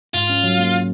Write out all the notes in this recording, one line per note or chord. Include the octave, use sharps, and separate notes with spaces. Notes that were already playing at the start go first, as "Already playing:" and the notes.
G#2 F4
C#4
F#3
A#3